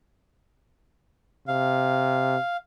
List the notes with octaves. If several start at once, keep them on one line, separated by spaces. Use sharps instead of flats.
C3 F5